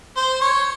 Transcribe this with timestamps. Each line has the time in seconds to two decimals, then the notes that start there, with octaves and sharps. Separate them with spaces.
0.16 C5
0.41 C#5